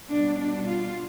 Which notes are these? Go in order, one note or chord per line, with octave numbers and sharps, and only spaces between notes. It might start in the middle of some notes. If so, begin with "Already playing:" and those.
B2 G3 D4
D4
F4